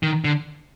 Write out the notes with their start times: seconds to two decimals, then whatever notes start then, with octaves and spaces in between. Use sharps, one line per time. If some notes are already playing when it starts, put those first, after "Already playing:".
0.03 D#3
0.24 D3